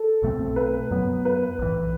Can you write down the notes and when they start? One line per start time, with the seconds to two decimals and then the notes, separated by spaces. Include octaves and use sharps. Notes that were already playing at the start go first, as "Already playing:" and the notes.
Already playing: A4
0.22 B1 B2 A3 C4
0.56 B4
0.91 F#2 F#3 B3
1.25 B4
1.59 B1 A2 E3